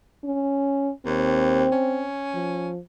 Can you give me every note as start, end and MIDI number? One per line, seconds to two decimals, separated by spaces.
0.25 0.91 61
1.06 1.66 39
1.06 2.07 60
1.72 2.71 61
2.34 2.79 53